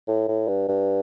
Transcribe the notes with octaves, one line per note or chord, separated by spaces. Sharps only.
A2
A2
G2
G2